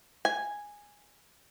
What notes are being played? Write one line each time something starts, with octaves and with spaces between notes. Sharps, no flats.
G#5